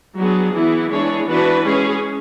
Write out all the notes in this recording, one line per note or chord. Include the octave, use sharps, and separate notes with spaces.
F#3 B3 D4 G#4
E3 B3 E4
E3 G#3 D4 G#4 C#5
E3 B3 D4 F#4 B4
G#3 C#4 G#4